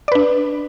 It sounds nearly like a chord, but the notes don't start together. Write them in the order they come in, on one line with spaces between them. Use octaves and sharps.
D5 B4 D4